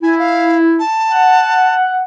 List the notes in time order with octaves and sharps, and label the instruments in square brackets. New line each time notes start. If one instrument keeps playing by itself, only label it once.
[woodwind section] E4 [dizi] G#5
[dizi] F5
A5
[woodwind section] F#5